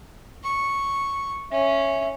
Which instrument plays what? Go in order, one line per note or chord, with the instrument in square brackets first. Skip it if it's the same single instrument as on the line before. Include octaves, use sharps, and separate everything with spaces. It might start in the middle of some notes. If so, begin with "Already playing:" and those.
[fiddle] C#6
[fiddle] C#4 [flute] E5